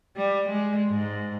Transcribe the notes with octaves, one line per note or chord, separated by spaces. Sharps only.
G3
G#3
G#2